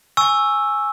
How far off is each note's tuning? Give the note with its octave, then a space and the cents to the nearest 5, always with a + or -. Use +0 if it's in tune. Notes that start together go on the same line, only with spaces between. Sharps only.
G#5 +0 C#6 +0 E6 +0